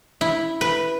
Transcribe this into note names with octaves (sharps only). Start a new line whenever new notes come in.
E4
B4